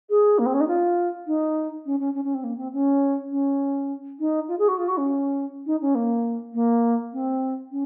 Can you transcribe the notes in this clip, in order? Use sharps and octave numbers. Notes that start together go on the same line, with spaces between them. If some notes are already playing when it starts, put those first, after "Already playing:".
G#4
A#3
C4
C#4
D#4
F4
D#4
C#4
C#4
C#4
C#4
C4
A#3
C4
C#4
C#4
D#4
F4
G#4
F#4
F4
F#4
C#4
D#4
C#4
A#3
A#3
C4
C#4